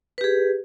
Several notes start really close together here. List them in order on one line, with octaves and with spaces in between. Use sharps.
B4 G4 G#4